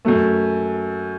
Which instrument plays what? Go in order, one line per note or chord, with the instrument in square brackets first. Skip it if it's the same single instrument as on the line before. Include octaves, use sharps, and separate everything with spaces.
[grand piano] F#2 F#3 A3